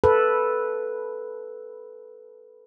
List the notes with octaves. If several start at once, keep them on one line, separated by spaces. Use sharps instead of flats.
A4 B4